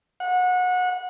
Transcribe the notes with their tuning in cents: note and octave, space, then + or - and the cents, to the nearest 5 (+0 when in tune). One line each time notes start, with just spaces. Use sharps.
F#5 -25